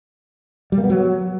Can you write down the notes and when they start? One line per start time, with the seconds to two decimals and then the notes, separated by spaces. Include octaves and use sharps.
0.72 G3
0.78 A#3
0.84 B3
0.90 F#3